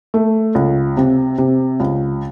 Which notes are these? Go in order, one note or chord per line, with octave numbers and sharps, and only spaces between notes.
A3
C#2
C3
C3
C#2